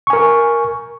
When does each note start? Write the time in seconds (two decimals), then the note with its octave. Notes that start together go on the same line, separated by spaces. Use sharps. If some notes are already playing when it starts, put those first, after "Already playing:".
0.07 C#6
0.10 G#5
0.13 A#4